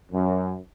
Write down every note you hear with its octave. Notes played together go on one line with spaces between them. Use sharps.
F#2